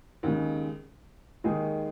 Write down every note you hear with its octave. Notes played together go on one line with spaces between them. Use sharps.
D#2 C#3 G#3
D#2 D#3 G#3 D#4 G#4